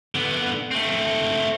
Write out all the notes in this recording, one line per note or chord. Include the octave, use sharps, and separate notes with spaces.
D3 B3
A3 C4